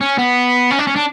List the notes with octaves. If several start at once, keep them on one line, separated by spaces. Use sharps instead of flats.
C#4
B3
C#4
D4
C#4
D4